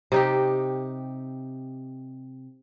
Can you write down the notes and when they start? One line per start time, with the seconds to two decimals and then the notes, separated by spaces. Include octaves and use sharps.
0.12 C3 D#4 G4